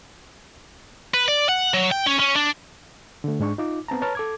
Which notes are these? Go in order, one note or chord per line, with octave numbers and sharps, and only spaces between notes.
B4
D5
F#5
F#3
G5
C#4
C#4
D4
D3 A3
G#2 G#3 D4 C#6
D#4 F4 D6
B3 C4 A5 A#5
B4 C#5 A5 A#5 F6
A4 D6 G#6